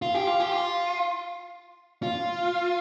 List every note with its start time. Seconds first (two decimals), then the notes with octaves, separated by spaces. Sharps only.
0.02 F4
0.14 G4
0.27 F4
0.40 G4
0.52 F4
2.03 F4